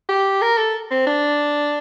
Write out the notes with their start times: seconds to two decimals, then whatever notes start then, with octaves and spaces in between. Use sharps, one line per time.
0.09 G4
0.42 A#4
0.58 A4
0.91 C4
1.07 D4